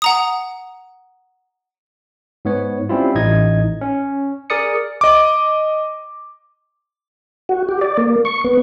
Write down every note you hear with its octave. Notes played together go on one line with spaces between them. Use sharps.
F#5 A#5 D#6
G#2 B3 C#5
G3 C4 C#4 E4 F4
A1 A2 D#4 D#5 G#6
C#4
G#4 A#4 D5 D#6 C#7
D#5 D6
F#4
G4
D5
A#3
C#6
B3